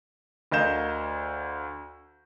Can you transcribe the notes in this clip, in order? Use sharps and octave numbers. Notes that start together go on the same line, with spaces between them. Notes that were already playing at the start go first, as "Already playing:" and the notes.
D2 A#4 D#5 F5 G6 E7